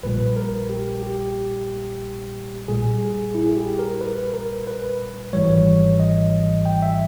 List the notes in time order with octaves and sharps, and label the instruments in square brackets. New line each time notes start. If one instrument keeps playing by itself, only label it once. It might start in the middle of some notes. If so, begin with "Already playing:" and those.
[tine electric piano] A#1 A#2 G3 B4
A#4
G4
G4
A#1 A#2 G3 G#4
G#4
E4
G#4
G4
A#4
B4
A#4
B4
G#1 G#2 E3 G3 C#5
D#5
G5
E5